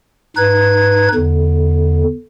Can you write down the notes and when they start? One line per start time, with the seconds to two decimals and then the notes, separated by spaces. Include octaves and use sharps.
0.37 G#2 D#4 B4 G#6
1.14 E2 D3